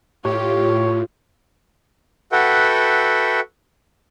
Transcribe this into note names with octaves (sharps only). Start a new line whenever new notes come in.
A2 F4 G4 C#5
F#4 A4 B4 E5 F#5 G5